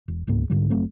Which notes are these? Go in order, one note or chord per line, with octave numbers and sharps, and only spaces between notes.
E1
D1 C#2 G#2 A#3
C2 G#2 D3 G3
F#1 F#3 A3 C4